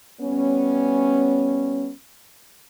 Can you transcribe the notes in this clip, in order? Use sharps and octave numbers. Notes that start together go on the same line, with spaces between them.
G3 B3 C#4